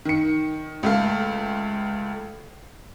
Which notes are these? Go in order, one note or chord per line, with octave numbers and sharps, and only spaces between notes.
D#3 C#7
C#2 A3 F5